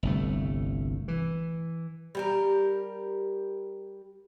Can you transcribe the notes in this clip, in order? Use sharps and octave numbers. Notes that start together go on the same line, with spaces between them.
G1 C2 A3
E3
G3 G4 A#4